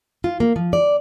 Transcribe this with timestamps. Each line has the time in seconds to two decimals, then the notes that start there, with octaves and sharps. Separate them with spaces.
0.24 F4
0.40 A#3
0.56 F3
0.73 D5